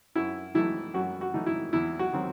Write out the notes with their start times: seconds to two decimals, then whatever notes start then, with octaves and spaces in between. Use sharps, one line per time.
0.15 F#2 E4
0.55 E3 A3 D#4 E4
0.94 F#2 F#4
1.21 F#4
1.34 E3 A3 D#4
1.46 E4
1.73 E2 E4
1.99 F#4
2.13 D#3 F#3 C4